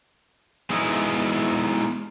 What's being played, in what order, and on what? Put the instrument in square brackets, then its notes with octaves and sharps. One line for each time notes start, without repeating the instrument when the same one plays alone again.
[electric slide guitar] G#3 B3 D#4 E4 F#4